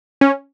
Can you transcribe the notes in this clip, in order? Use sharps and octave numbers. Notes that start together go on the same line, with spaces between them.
C#4